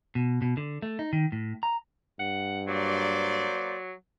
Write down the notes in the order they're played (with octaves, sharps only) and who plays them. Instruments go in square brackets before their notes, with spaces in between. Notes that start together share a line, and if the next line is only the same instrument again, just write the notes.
[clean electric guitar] B2
B2
D3
A3
D#4
D#3
A2
A#5
[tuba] G2 [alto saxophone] F#5
[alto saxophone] F#3 [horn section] A#3 C5 D5